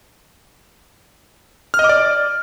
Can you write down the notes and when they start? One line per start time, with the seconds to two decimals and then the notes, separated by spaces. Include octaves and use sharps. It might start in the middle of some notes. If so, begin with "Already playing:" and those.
1.74 F6
1.79 D#5
1.84 D6
1.89 D5